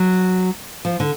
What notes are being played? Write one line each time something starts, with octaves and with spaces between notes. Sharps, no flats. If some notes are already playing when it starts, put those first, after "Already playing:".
Already playing: F#3
F3
D3